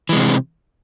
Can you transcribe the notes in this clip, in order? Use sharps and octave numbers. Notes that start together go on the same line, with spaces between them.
C3 E3 G#3